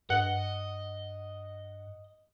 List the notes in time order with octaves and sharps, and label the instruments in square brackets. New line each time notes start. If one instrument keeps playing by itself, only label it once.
[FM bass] G2 [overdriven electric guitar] D#5 [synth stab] F#5